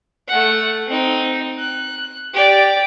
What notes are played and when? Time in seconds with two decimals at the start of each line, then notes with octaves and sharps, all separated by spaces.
0.28 A3 F#5
0.88 C4 D#4
1.59 F#6
2.34 G4 D5